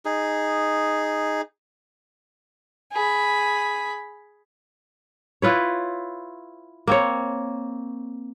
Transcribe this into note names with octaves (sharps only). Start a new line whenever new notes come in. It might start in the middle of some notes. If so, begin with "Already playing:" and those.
D#4 G#4
G#4 B5
E4 F4 B4 C#5
A#3 C4 C#5